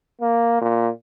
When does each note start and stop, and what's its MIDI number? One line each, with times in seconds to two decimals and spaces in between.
0.21 0.59 58
0.61 0.89 46